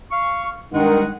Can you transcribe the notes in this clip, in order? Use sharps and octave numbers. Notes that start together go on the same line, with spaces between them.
F5 C#6
G2 D#3 G#3 F#5